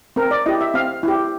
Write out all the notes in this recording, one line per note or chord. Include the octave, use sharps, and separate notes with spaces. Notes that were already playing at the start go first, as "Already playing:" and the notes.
C4 A#4
D5
E4 G4 D#5
E5
C4 F5
E4 G4